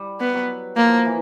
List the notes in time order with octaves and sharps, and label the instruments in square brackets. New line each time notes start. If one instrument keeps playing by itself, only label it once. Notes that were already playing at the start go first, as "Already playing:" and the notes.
Already playing: [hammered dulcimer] G3
[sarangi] B3
[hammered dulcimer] F#3
[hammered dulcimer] F3 [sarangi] A#3
[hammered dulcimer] E3